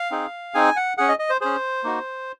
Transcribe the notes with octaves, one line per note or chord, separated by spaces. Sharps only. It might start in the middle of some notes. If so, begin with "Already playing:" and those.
Already playing: F5
C4 D#4 G#4
C4 D#4 G#4 G#5
F#5
C#4 G#4 F#5
D#5
D#5
C5
C#4 G#4 C5
A#3 D#4 F#4